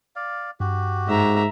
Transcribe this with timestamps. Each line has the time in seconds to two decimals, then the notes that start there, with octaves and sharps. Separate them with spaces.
0.16 D5 F5
0.60 G2 F#4 G4
1.08 G#2 E5 A#5